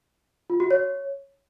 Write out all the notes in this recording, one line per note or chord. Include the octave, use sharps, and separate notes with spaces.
F4
F#4
C#5